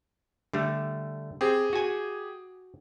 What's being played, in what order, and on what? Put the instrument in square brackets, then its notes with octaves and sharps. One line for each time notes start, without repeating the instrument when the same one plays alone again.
[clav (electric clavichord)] D3 G3 A3
[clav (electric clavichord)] C4 [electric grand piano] G4 G#4
[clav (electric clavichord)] F#4 G#5